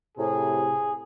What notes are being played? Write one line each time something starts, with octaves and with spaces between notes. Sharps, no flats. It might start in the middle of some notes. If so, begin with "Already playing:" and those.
A2 C3 G#4